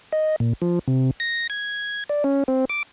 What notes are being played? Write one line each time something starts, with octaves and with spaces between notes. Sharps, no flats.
D#5
A#2
F3
C3
A#6
G#6
D5
C#4
C4
D6